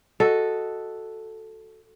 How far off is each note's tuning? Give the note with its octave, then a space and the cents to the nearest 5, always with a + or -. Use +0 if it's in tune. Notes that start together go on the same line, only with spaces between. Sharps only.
F#4 +0 A4 +0 D#5 +0